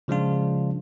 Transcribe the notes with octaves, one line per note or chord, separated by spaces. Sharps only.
C#3 F3 G#3 D4 F4